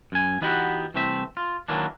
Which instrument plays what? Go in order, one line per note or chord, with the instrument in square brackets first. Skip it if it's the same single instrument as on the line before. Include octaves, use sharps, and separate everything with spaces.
[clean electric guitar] F#2 G#5
E3 B3 D#4 F#4 G4 B4
C2 E3 A3 C4 E5
F4
D#3 E3 F#3 A#3 D4